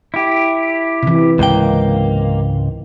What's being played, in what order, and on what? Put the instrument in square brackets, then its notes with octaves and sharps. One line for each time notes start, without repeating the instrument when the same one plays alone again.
[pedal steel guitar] E4 G4
[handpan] C3 E3
[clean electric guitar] C#2 G#2 G5 [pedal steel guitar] A#3